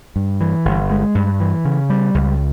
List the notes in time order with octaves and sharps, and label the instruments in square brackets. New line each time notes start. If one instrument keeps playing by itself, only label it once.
[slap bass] G2
E3
G1
G#3
G2
E3
C#3
G3
C#2